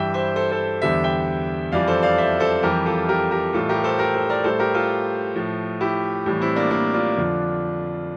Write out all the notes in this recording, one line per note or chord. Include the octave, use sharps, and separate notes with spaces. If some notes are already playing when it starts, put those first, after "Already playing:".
Already playing: G2 E3 G3 E5 G5
C5 E5
A4 C5
A4 C5
E2 D3 G3 C5 E5
E5 G5
F2 E3 G3 D5 F5
A4 C5
D5 F5
C5 E5
A4 C5
F2 E3 G3 G4 A#4
F4 A4
G4 A#4
G4 A#4
A2 E3 G3 F4 A4
G4 A#4
A4 C5
G4 A#4
A4 C5
A#4 D5
A2 G3 A4 C5
G4 A#4
F4 A4
A2 F3
E4 G4
A2 E3 G3
C4 E4
A#3 D4
A#3 D4
D4 F4
F2 D3 F3